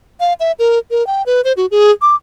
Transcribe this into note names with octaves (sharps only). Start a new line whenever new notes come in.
F5
E5
A#4
A#4
G5
B4
C5
F#4
G#4
D6